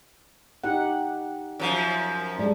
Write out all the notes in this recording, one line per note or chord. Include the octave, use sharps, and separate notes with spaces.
D#4 G4 F#5
F#2 F3
G3 G#3 D4